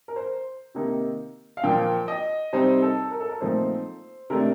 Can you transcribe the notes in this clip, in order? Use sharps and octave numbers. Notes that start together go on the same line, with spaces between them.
A#4
C5
C3 D#3 A#3 D#4
F5
A#2 F3 A#3 G5
D#5
C3 G3 C4 D#4 C5
A4
A#4
A4
A#4
A#2 F3 A3 C4 D#4 C5
C3 D#3 A3 D4 A#4